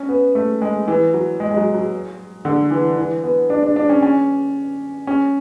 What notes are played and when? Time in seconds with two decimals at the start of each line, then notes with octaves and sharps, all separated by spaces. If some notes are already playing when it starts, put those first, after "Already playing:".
Already playing: C#4
0.09 B3
0.35 A3
0.62 G#3
0.88 E3
1.14 F#3
1.40 G#3
1.51 G#3
1.57 F#3
1.74 F#3
2.45 D3
2.71 E3
2.97 E3
3.24 B3
3.50 D4
3.63 D4
3.76 D4
3.89 C#4
4.02 C#4
5.07 C#4